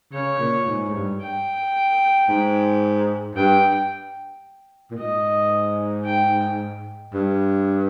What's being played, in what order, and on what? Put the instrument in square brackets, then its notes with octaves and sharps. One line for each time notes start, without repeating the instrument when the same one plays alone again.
[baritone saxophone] C#3 [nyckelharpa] C#5
[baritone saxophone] A#2
G#2
G#2
G2
[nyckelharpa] G5
[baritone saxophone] G#2
[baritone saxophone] G2 [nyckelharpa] G5
[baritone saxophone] A#2
[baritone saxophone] G#2 [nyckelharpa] D#5
[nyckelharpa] G5
[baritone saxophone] G2